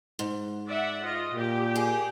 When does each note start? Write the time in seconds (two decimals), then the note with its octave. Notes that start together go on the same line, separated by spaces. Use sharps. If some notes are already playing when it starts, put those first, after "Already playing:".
0.19 G#2
0.67 D5 E5 F#5
1.04 F4 D#5
1.34 A#2 G4
1.76 G#4